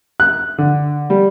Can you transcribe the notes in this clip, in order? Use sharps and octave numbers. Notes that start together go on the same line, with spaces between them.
F#6
D3
G3